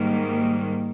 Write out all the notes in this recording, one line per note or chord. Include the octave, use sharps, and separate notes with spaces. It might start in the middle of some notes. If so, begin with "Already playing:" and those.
Already playing: G#2 D#3 G3 A#3